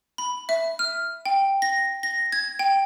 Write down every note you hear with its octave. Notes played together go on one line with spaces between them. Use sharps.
B5
E5
F6
G5
A#6
A#6
G#6
G5